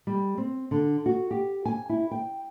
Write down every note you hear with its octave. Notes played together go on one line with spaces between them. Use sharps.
G3
C4
D3
F#4
G4
G#5
E4
G5